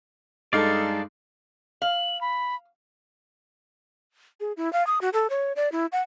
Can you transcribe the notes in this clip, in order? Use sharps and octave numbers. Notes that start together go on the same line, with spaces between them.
G2 G#3 D#4 A4 D5 F5
F5 F#7
B5
G#4
E4
F5
D#6
F#4
A4
C#5
D5
E4
F#5